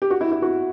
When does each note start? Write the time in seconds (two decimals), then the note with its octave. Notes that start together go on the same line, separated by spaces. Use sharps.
0.02 G4
0.10 F#4
0.21 E4
0.32 E4
0.42 F#4